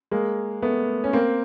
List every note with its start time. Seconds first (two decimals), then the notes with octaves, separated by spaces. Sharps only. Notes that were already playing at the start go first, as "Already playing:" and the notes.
0.11 G#3 A#3
0.62 A3 B3
1.04 C#4
1.13 A#3 C4